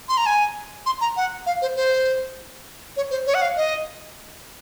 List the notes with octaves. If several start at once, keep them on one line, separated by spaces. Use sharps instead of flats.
C6
A#5
G#5
C6
A#5
F#5
F5
C5
C5
C#5
C5
C#5
F#5
F5
D#5